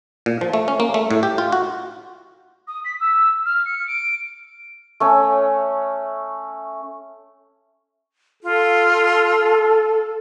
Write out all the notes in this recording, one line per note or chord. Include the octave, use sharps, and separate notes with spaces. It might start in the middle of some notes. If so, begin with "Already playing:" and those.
A#2
F3
A3
C#4
A#3
A3
A2
G4
F4
F#4
D#6
B6
E6
F6
C#7
D7
A3 C#4
F4 A4